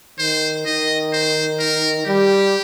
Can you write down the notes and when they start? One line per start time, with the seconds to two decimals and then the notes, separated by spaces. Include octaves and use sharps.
0.19 D#3 C5
0.66 D#3 D#5
1.13 C5
1.60 A#4
2.06 G3 G4